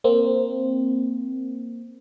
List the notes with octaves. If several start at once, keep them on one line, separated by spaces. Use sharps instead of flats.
A#3 C4